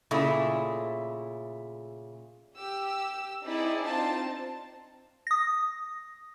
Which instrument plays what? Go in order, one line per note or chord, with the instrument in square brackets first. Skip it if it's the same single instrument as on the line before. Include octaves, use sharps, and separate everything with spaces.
[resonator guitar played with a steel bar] A#2 C#3 A3 E4
[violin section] G4 E6
C4 D#4 E4 G#4 D5
C4 D4 D#4 F4 C5 A5
[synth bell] D#6 A#6